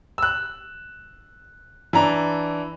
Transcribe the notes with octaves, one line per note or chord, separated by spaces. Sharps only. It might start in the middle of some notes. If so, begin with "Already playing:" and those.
E6 F#6
E3 D4 A#5